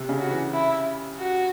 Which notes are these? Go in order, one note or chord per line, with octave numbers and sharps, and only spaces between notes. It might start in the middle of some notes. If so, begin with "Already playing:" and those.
Already playing: C3
C#3
F#4
E3
E4
F#4